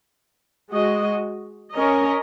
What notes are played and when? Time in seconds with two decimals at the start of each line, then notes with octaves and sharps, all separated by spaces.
0.71 G#3 F#4 D#5
1.72 C#4 A#4 D#5